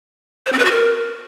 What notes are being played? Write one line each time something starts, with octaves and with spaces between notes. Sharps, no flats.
C5
C4
B4
F#4
A#4